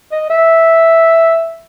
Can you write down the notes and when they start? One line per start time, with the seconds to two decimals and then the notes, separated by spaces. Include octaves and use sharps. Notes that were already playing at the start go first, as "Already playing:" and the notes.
0.12 D#5
0.30 E5